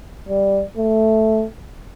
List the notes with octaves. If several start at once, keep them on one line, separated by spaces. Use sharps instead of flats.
G3
A3